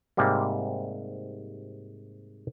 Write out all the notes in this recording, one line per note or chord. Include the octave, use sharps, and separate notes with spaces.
G#2 C3 G3 A#3